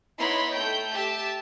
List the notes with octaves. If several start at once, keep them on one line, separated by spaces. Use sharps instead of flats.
B3 D#4 E4 C#5 B5 C6
A3 G5 G6
G4 E5 A5